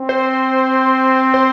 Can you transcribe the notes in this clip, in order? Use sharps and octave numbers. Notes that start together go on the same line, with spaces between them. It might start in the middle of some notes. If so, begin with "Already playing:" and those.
Already playing: C4
C5
C5